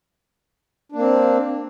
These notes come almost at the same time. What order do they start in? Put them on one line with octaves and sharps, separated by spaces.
D4 A#3 C4